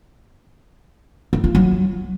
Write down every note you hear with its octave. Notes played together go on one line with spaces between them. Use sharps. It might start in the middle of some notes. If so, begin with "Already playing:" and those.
C4
F4
F#3